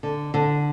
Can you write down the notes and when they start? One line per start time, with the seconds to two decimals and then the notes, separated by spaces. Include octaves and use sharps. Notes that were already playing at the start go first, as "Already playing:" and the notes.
0.03 D3
0.34 D3